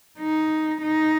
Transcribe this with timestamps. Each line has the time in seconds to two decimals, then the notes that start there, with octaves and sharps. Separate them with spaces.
0.19 D#4
0.82 D#4